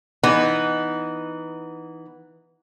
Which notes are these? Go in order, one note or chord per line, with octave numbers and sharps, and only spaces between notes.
E3 B3 D#4